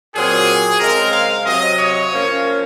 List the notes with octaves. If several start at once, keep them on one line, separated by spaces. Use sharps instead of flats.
A#2 F#3 C4 G#4
C#3 G#3 C4 A#4
F5
C3 F#3 C4 D#5
C#5
F3 A#3 C#4